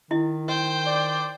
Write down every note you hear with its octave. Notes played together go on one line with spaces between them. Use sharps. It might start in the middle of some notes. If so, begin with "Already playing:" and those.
D#3 E4 D#5
C5 D#5 G5
D5